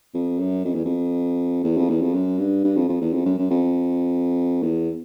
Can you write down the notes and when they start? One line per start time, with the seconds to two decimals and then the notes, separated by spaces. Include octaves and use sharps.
0.14 F2
0.39 F#2
0.65 F2
0.75 E2
0.85 F2
1.64 E2
1.77 F2
1.90 E2
2.01 F2
2.14 F#2
2.39 G2
2.64 G2
2.77 F2
2.89 F2
3.01 E2
3.13 F2
3.25 F#2
3.39 F#2
3.50 F2
4.63 E2